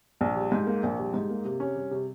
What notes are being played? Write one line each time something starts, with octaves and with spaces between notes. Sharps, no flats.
A#1
G3
G#2
A#3
A#1
G3
G#2
A#3
C3
C#4
G3
C3